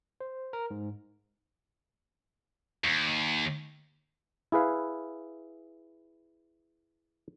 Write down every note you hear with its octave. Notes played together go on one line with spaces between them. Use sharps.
C5
A#4
G#2
D#2
E4 G#4 B4 F5